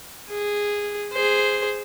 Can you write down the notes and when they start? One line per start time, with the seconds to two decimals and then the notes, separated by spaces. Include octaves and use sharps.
0.30 G#4
1.13 G#4 C5